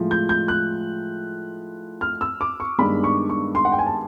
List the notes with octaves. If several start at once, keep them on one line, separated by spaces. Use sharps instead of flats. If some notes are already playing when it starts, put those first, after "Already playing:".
Already playing: A2 F3 G#3
G6
G6
F#6
F6
E6
D6
C#6
G2 D#3 G#3 B3 D4 B5
C#6
C#6
C6
F#5
G5
G#5
A5